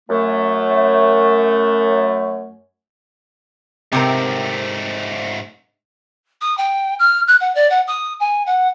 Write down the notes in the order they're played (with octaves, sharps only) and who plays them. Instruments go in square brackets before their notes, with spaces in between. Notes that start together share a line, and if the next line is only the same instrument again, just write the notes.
[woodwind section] F#2 A3
[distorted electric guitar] G#2 A3 [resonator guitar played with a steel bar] C3 C4 A#4
[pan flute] D#6
G5
F6
F#6
F#5
D5
F#5
D#6
G#5
F#5